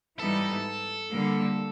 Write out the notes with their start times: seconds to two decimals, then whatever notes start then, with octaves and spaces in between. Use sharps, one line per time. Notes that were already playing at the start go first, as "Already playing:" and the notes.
0.19 G#2 E3 G3 B3 D#4 A4
1.11 D3 G3 A#3